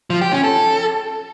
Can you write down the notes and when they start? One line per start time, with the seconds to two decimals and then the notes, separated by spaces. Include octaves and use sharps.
0.10 F3
0.21 G4
0.32 C#4
0.44 A4